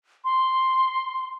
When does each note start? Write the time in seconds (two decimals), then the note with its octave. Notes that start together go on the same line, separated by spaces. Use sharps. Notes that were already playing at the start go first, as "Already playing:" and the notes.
0.25 C6